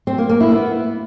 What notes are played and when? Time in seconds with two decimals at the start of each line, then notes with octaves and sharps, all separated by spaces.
0.07 C4
0.18 A#3
0.29 A#3
0.41 E4
0.52 B3